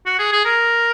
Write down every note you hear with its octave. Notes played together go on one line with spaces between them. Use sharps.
F#4
G#4
G#4
A#4